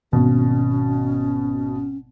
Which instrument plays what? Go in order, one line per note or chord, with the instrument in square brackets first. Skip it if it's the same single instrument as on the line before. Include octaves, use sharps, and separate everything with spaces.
[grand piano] G#1 B2 [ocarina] C#4